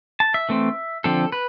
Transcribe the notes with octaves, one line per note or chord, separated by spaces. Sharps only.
A5
E5
E3 A3 C4
D3 F3 C4 A4
B4